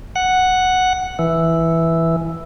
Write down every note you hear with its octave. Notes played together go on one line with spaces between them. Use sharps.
F#5
E3